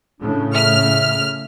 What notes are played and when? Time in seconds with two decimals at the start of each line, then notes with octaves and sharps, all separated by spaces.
0.20 A2 C#3 D4
0.55 E5 F6